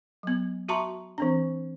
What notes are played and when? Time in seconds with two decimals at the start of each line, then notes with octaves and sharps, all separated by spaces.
0.23 F#3 B3
0.69 F#4 E5 A5 A#5 C6 C#6
1.18 E3 C4 D4